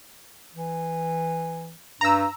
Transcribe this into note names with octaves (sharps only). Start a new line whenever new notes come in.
E3
G2 A#5 E6